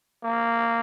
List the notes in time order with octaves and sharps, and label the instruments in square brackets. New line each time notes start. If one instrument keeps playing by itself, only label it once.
[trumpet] A#3